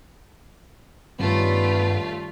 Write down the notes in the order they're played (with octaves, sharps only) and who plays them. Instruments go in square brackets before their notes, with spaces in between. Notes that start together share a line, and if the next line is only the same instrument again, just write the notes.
[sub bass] G2 [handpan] D#3 G3 C#4 [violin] A3 F4 [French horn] B3